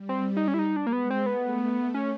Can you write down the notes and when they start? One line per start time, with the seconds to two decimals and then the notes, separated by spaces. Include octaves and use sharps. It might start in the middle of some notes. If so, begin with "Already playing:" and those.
Already playing: G3
0.09 C4
0.37 D#4
0.48 C#4
0.54 E4
0.59 D#4
0.76 D4
0.87 A#3
0.93 G#3 B3
1.10 C4
1.26 A3 B3
1.94 C#4